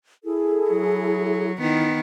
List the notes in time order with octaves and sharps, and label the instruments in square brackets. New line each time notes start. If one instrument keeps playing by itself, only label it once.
[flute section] E4 G#4 A4
[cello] F#3
[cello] D#3 B3 [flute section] E4